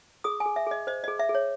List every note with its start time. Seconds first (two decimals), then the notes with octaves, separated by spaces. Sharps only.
0.24 G#4 D#6
0.40 G#5
0.46 G#4
0.56 E5
0.67 G#4 D#5
0.87 C5 D#5
1.04 G#4 D#5
1.19 E5
1.29 G#4
1.35 C#5